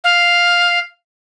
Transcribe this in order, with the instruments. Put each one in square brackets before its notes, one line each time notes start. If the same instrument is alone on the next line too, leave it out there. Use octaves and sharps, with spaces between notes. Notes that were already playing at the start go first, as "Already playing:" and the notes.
[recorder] F5